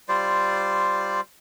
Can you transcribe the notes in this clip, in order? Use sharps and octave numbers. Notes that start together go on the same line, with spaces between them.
G3 F4 C5 D5